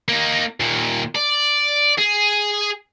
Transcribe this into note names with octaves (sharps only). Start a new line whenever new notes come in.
A#3 D#4
D#2 A#2
D5
G#4